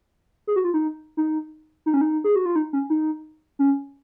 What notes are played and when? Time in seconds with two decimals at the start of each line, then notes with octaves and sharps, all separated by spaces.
0.47 G#4
0.56 F#4
0.64 F4
0.74 D#4
1.17 D#4
1.86 D#4
1.94 C#4
2.01 D#4
2.24 G#4
2.36 F#4
2.46 F4
2.56 D#4
2.73 C#4
2.90 D#4
3.59 C#4